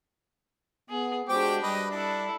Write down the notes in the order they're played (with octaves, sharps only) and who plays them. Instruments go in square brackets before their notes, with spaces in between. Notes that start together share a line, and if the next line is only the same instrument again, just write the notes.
[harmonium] B3 [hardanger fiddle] G#4
[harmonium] G#3 F#4 C5 [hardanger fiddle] D4 G4 [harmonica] G5 D6
[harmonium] G3 [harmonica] B4 D#5
[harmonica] D4 [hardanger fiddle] E4 A4